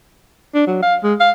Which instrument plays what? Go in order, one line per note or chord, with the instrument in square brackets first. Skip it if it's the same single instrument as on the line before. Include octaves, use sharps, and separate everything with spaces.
[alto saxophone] D4
F#3
F5
G#3
F5